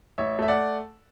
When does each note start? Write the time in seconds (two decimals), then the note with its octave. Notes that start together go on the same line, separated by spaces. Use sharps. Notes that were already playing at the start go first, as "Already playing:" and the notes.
0.18 A1 C#5 E5
0.39 A3 E5
0.48 D5 F#5